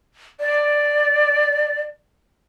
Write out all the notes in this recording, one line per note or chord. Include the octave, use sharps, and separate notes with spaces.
D5